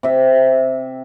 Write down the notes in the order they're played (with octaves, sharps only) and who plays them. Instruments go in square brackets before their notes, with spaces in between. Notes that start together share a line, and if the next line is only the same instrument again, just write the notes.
[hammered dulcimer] C3 E5